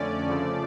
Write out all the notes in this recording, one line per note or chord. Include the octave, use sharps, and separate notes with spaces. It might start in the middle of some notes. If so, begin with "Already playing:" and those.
Already playing: F2 D3 A3 C#4 D5
C#3 F3 A3